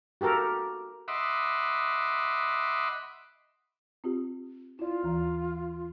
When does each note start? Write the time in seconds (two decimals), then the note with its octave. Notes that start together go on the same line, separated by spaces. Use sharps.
0.21 F#4 G4 A4 A#4
1.08 D#5 E5 F#5 B5 C6 D6
4.04 C4 F4 G4
4.79 E4 F4 D5
5.03 D#2 E3 A#5